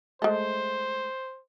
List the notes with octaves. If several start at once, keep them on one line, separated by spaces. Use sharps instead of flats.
G#3 A3 C5